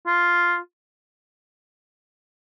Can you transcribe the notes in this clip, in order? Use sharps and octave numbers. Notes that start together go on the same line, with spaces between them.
F4